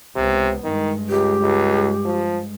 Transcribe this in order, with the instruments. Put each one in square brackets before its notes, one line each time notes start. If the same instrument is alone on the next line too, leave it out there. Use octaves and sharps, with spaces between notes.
[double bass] C#2 B3 [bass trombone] C3
[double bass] G2 G#3 [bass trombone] D#3
[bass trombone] C#2 [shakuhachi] G4
[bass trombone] C#2
F3